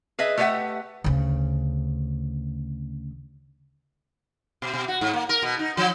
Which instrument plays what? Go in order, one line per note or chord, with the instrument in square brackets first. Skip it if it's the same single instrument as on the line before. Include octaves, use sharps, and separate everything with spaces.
[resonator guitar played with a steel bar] G#4 B4 D#5 E5
A3 G4 B4 C#5 E5 F#5
[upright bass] D2 C#3
[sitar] B2
B2
F#4
G#2
A#3
A#4
B2
D#4
F3